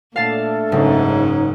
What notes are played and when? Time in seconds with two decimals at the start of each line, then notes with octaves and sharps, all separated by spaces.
0.16 A#2 A3 D4 A4 F5 A5
0.72 F#1 G#2 C#4 D#4